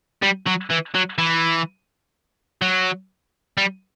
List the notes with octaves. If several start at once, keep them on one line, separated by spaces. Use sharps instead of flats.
G3
F#3
E3
F#3
E3
F#3
G3